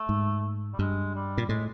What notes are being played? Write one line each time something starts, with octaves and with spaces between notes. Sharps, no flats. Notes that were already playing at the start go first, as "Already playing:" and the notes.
Already playing: A3
G#2
G3
G2 G#3
G3
A#2
A2 G#3